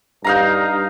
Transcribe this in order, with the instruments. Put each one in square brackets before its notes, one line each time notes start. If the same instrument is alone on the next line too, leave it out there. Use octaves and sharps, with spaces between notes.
[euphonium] G2 [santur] D#4 F5 A#5